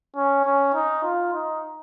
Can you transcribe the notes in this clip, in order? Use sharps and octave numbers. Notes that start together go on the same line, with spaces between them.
C#4
C#4
D#4
F4
D#4